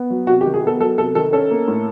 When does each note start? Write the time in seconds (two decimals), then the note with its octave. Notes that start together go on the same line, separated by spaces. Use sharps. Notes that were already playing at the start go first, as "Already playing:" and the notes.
Already playing: B3
0.10 F#3
0.27 C3 F#4
0.41 G4
0.45 D#3
0.54 G#4
0.63 B3 A4
0.80 F#3 A4
0.98 C3 A4
1.15 D#3 A4
1.33 C#4 A4
1.50 A#3
1.68 A2